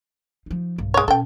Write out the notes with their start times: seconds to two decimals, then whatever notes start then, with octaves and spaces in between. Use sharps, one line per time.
0.46 F3 D#4
0.78 B1 G2
0.94 G#3 C#5
1.08 B2 C#4 A4 G5